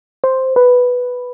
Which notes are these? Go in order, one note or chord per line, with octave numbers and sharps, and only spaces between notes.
C5
B4